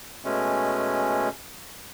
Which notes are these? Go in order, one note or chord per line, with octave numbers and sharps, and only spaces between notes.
B2 G#3 A3 C#4